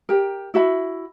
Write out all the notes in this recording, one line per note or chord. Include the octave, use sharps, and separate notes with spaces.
G4 A#4
E4 F#4 E5 B5